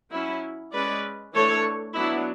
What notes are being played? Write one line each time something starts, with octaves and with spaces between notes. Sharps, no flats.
F#3 C#4 E4
G#3 C#4 B4 D5
E3 A3 D4 A4 C#5
F#3 B3 D4 E4